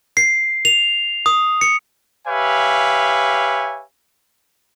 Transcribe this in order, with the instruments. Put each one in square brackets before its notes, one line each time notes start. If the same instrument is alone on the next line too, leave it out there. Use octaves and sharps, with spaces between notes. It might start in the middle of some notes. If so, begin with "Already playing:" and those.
[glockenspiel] C7
F7
D#6
C#7
[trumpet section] G4 B4 C#5 E5 F5 G#5